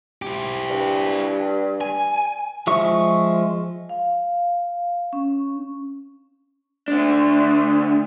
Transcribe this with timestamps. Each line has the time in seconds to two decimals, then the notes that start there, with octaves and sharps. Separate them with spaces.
0.22 E4 G4
0.70 G2
1.81 G#5
2.67 F3 G#3 E5 C#6
3.89 F5
5.13 C#4
6.88 D2 D4